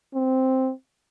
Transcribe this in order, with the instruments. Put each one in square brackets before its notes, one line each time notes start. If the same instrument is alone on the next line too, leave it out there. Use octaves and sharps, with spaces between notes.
[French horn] C4